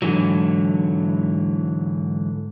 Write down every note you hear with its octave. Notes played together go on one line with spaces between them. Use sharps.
G#2 D3 E3 F#3